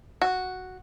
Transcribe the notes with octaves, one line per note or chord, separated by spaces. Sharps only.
F#4